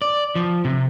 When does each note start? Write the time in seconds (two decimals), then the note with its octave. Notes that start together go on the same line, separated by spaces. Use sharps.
0.02 D5
0.35 F3
0.65 C3